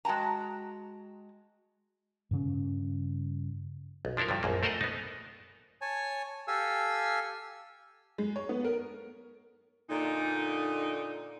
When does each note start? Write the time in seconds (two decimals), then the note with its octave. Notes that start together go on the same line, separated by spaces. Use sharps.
0.05 G#3 F#4 G5 A5 A#5
2.31 G2 C#3 C#4
4.05 B1
4.17 F3 D4 E4 A4 A#4
4.29 G2 D3 F3
4.43 A#1 F#2 A#3
4.63 A3 A4 A#4 C5 D#5 F#5
4.81 B3 D#4
5.81 C#5 G#5 A5
6.48 G4 A4 F5 G#5 E6
8.18 G#3
8.36 C#5
8.49 B3
8.65 A#4
9.90 A#2 D3 D#4